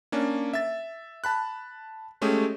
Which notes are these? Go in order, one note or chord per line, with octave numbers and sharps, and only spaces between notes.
A#3 C#4 D4
E5 A6
A5 B5 F#6
G#3 A3 C#4 G4 G#4